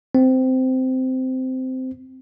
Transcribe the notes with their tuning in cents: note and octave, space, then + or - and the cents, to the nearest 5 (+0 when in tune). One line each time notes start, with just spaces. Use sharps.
C4 -15